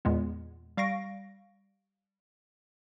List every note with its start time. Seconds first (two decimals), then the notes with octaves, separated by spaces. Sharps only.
0.05 E2 A#2 G#3 B3
0.77 G3 F5 C#6 A#6 D7